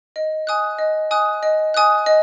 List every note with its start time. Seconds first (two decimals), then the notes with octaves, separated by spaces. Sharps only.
0.16 D#5
0.47 G#5 D#6 F#6
0.79 D#5
1.11 G#5 D#6 F#6
1.43 D#5
1.74 G#5 D#6 F#6
2.06 D#5